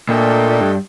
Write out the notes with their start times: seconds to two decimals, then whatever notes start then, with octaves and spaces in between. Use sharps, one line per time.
0.08 A#2 A3 D4 A4 D#5 G5
0.61 G2